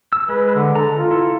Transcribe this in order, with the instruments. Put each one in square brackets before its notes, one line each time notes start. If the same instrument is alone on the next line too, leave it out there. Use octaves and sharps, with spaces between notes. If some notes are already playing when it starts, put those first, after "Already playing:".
[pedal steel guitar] E6
[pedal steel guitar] G#3 [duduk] B4
[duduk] D3
[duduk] A4 [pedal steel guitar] A#5
[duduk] F4
[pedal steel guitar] E4 A4